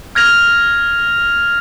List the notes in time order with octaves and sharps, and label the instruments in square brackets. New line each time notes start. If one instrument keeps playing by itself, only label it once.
[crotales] F6 G#6 A#6 F7